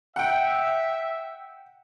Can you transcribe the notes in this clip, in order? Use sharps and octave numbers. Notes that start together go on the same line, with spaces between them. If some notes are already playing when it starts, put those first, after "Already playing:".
E5 F#5 G5